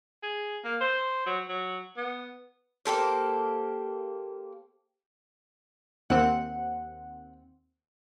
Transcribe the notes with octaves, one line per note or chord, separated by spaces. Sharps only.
G#4
A#3
C5
F#3
F#3
B3
A#3 G4 A4 C5
D#2 C4 F#5